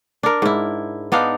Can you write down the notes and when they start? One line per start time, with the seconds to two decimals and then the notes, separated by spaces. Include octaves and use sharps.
0.23 D4 A#4
0.42 G#2 E4
1.12 B3 D4 D#4 F5